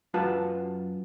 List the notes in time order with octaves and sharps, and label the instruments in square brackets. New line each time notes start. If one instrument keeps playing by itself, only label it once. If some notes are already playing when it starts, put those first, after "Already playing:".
[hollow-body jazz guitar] F#2 F4 F#4 B4 A5